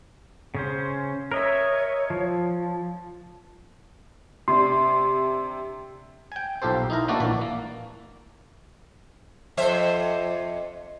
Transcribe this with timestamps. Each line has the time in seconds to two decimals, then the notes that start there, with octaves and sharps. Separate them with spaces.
0.55 C#3 C#4 C5
1.32 A#4 C#5 D#5 E5
2.10 F3
4.48 C3 D4 C6
6.32 G5 G#5
6.62 B1 F4 G4 A4 C5
6.90 D#4 E4 A#4
7.08 A3 A#3 D4 F#4 A4 D5
7.20 A#1 E3 D5
7.41 A#3
9.57 F2 C5 E5